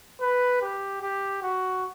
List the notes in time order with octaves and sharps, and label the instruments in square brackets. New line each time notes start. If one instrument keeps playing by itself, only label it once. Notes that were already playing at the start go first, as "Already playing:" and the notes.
[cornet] B4
G4
G4
F#4